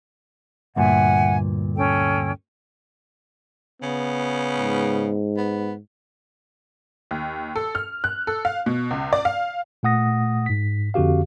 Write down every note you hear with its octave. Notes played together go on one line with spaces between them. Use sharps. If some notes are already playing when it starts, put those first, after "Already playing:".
D2 G2 A#2 E5 F#5 G#5
C#4 A4 G5
C#3 B3
G#2
B3
D#2
A4
F6
F#6
A4
F5
B2
C#2
D5
F5
A#2 A3 F#5 D#6 A#6
G#2 B6
F2 D3 F#4 G4 F5